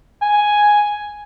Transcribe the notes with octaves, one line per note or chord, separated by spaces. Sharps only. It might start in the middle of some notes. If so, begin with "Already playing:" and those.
G#5